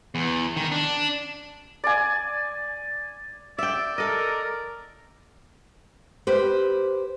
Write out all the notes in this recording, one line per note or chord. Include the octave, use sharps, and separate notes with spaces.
E2
D#3
D4
D5 G#5
D5 E5 G5
A4 A#4 D#5
G4 B4 C5